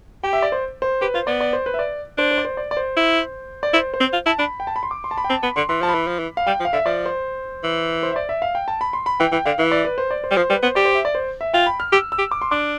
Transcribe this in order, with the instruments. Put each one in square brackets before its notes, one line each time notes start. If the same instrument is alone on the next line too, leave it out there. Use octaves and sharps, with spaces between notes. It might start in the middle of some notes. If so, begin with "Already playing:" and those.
[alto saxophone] G4 [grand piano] G5
[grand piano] E5
D5
C5
C5
[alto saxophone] G4 [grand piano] B4
[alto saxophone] F4 [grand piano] C5
[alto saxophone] B3 [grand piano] D5
[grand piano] D5
C5
B4
E5
D5
[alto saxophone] D4 [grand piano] C5
[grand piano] C5
D5
C5
D5
D5
C5
[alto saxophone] E4
[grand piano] D5
[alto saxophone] E4 [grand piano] C5
[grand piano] C5
[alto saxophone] C4
F4
[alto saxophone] E4 [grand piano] A5
[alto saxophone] D4 [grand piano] B5
[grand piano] G5
A5
B5
C6
D6
C6
A5
B5
G5
[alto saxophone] C4 [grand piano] A5
[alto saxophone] B3 [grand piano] B5
[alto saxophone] D3 [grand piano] C6
[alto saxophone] E3 [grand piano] C6
[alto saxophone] F3 [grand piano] A5
[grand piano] B5
[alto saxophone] E3
F3
E3
[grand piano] F5
[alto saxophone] G3 [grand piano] G5
[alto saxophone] F3
[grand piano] F5
[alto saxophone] D3 [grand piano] E5
[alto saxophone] F3 [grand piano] D5
[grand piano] C5
[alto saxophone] E3
[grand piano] C5
E5
D5
E5
F5
G5
A5
B5
C6
B5
[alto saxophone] E3 [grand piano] G5
[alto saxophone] E3 [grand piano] G5
[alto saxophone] D3 [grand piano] F5
[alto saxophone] E3 [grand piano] E5
[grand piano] D5
B4
C5
D5
C5
[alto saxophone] G3
[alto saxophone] F3 [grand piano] C5
[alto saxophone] G3 [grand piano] B4
[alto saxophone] B3 [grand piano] C5
[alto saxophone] G4 [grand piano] D5
[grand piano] C5
E5
D5
C5
E5
[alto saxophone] F4 [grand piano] G5
[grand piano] B5
F6
[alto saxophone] G4 [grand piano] E6
[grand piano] E6
[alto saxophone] G4
[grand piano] D6
C6
[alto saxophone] D4 [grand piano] D6